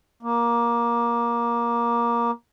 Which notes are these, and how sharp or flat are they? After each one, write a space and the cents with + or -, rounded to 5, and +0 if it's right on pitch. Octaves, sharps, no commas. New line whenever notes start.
A#3 +15